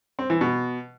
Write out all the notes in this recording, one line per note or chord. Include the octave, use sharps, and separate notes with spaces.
C4
E3
B2